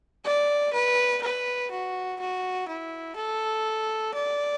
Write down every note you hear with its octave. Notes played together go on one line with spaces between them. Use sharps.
D5
B4
B4
F#4
F#4
E4
A4
D5